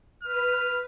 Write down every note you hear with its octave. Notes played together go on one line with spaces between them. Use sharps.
B4 F6